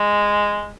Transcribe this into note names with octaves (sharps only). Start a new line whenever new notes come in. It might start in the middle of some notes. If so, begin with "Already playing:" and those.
Already playing: G#3